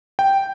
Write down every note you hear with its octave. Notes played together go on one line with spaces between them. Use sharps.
G5